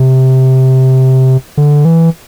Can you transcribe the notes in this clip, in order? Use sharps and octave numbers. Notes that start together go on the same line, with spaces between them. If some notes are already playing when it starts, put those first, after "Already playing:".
Already playing: C3
D3
E3